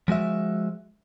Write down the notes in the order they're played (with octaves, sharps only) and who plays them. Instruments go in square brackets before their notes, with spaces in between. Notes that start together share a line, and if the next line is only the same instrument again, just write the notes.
[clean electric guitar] F3 G#3 F#4 E5